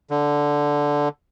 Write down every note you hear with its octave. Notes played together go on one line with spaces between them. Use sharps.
D3